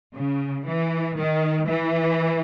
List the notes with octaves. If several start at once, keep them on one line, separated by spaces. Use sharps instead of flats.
C#3
E3
D#3
E3